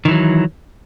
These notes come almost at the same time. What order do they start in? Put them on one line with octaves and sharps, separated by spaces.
D#3 E3 F#3